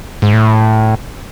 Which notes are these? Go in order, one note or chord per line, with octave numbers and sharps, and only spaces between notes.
G#2
A2